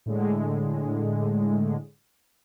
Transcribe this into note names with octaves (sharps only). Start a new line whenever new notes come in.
A2 D3 G#3